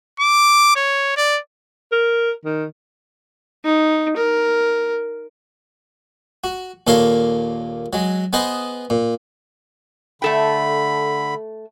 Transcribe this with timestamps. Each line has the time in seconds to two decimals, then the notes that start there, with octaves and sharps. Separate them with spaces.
0.20 D6
0.76 C#5
1.17 D5
1.92 A#4
2.45 D#3
3.64 D#4
4.16 A#4
6.44 F#4
6.87 D#2 A#2 A4 A#4 C#5 F5
7.93 F#3 G#3
8.33 B3 G#4 B4 C5 D#5
8.90 A#2
10.22 D3 A3 A4 G5 B5